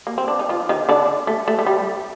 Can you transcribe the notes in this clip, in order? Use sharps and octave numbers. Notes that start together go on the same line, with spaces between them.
A#3
C4
D4
D#4
F3 F4
D#3 D#4
D3 D4
A3
A3
A3
G3